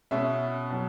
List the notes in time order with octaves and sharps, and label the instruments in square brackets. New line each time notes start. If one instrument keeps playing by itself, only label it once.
[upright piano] B2 G#3 C#4 E5
B2 F#3